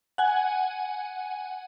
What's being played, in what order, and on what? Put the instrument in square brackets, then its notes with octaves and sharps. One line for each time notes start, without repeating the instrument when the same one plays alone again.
[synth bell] F#5 G#5